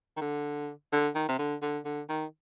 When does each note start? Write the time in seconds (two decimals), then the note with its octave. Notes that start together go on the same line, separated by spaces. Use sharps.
0.17 D#3
0.21 D3
0.92 D3
1.15 D#3
1.29 C3
1.39 D3
1.62 D3
1.85 D3
2.09 D#3